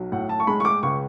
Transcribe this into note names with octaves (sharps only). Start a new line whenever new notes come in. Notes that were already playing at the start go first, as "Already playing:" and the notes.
Already playing: B1 F#3
A2 F#5
A5
C#6
G#3 B5
C#6
D6
C#2 C#6